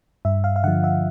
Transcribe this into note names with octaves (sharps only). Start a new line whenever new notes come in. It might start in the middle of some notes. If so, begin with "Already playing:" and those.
G2 E5
F5
F5
D3 F3 F#5
E5